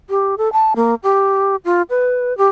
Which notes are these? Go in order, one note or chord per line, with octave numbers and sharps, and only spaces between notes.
G4
A4
A5
A#3
G4
F4
B4
G4